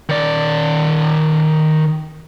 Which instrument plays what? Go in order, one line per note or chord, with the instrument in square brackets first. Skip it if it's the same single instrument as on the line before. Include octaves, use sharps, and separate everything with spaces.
[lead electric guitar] D#3 D5